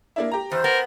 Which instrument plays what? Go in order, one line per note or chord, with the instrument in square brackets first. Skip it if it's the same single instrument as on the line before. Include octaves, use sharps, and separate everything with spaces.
[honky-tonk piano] A#3 D4 E4
G4 A#5
[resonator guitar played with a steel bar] E2 [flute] C5
[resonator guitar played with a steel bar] B3 [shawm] A#4